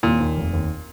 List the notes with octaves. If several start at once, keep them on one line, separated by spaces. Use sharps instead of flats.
D#2 A#2
D#2
F1
D#2